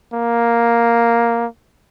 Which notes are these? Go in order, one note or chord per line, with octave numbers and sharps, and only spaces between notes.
A#3